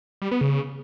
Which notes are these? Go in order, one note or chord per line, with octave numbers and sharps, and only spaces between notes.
G3
B3
C#3